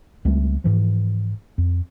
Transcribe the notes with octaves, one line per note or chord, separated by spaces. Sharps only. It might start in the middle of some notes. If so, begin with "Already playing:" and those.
C#2 G3 A3 C4
G#2 E3 F3
F2